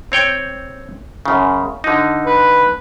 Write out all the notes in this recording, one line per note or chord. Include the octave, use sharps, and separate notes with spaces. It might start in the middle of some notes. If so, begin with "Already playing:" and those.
C4 C#5 G5
F#2 C#3
D3 D#4
B4